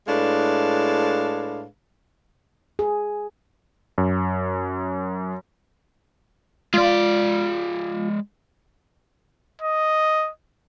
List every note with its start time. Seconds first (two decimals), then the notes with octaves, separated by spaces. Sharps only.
0.07 A2 G#3 D4 B4 F5
2.79 G#4
3.98 F#2
6.74 G#3 F4 D5
9.61 D#5